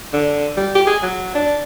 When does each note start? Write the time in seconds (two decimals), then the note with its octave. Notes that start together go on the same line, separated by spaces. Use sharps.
0.14 D3
0.57 G3
0.75 G4
0.87 G#4
1.03 F#3
1.35 D4